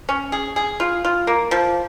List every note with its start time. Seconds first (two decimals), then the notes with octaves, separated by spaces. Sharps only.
0.09 C#4
0.32 G#4
0.56 G#4
0.80 F4
1.05 F4
1.27 A#3
1.51 F3